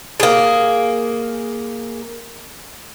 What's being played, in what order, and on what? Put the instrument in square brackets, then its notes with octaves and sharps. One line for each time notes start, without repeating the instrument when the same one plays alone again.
[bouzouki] A#3 G#4